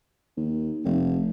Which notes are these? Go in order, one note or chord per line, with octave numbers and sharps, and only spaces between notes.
D#2
F1